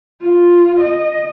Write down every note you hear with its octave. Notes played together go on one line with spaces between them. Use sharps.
F4
D#5